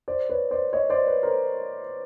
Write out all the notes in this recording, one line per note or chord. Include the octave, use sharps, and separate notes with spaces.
C5 D5
B4 C#5
C5 D5
C#5 D#5
C5 D5
B4 C#5
A#4 C5